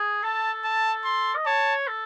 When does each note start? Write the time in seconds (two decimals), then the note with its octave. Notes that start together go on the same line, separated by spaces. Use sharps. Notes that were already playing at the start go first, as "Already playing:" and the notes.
Already playing: G#4
0.23 A4 A5
0.64 A5
1.05 C6
1.36 D#5
1.46 C#5 A5
1.88 A4